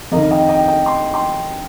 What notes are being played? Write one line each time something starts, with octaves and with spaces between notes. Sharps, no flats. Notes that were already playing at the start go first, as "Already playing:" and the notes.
F2 D#3 A#4 D#5
D#5 G5
D#5 G5
D#5 G5
C6
G5 C6